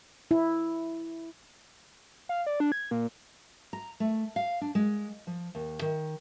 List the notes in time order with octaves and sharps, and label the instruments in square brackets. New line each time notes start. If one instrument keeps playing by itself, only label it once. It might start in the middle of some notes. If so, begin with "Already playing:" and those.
[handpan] E4
[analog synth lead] F5
D5
D4
G#6
A#2
[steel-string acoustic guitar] A#5
A3
F5
D4
G#3
F3
D#2
D#3